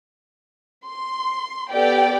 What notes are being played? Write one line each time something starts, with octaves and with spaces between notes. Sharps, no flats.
C6
B3 G4 A4 D5 G5